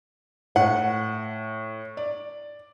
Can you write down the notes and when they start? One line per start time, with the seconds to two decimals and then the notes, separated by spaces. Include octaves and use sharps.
0.56 A2 F#5
1.97 D5